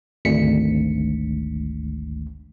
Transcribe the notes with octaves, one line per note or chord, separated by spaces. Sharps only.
G#1 D2 B6 C#7